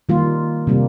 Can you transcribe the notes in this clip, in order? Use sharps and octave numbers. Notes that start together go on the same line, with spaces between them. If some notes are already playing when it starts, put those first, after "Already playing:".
D#3 G3 A#3 F4
C3 G3 A#3